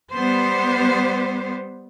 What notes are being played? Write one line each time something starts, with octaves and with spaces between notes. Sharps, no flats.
G3 B3 C5